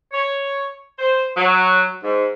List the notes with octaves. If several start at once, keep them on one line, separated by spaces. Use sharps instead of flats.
C#5
C5
F#3
G#2